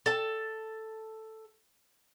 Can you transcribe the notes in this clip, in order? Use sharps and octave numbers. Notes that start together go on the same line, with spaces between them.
A4 A5